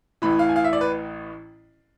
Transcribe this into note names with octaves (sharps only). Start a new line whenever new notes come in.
A1 A2 E3 B5
F5
G#5
F5
E5
D5
B4